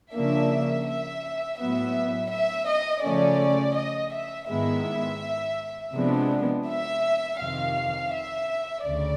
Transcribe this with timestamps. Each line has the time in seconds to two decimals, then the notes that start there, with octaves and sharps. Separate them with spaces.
0.14 C#3 F3 A#3 D4 E5
0.86 E5
1.58 A2 F#3 B3 E5
2.31 E5
2.68 D#5
3.04 C#3 F3 A3 C#4 D5
3.76 D#5
4.13 E5
4.49 G#2 D#3 G#3 B3 E4 E5
5.94 C3 F3 G#3 B3 D4
6.67 E5
7.39 F2 C3 D#3 F5
8.13 E5
8.85 D2 C#3 D5